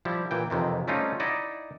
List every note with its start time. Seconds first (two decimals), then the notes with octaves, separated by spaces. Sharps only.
0.05 F3 G3 E4
0.31 A#2 E3 G5
0.50 F2 C3 D#3 E3
0.88 G3 A3 C4 C#4 D#4 F4
1.20 D#4 E4 D5 D#5 F#5